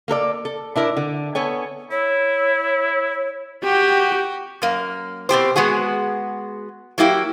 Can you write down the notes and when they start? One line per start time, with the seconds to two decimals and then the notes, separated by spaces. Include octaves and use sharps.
0.08 A#3 A4 A#4 D5
0.45 A4
0.76 D4 E4 A#4 C#5 D5
0.97 D3
1.35 B3 A4 C#5 G#5
1.91 E4 C#5
3.63 F#4 G4 G5
4.62 F#2 A#3
5.29 B2 C4 G4 C5
5.56 G#3 B3 F#4 G#4
6.98 F#3 A#3 E4 G4